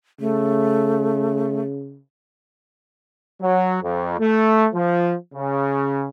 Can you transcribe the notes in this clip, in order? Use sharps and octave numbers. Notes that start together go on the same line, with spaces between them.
C#3 A3
F#3
F2
A3
F3
C#3